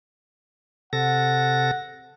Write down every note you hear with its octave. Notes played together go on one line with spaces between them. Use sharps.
C3 A4 F#5 A#6